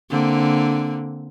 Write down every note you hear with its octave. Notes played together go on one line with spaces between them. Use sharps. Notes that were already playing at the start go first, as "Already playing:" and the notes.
D3 A#3 C4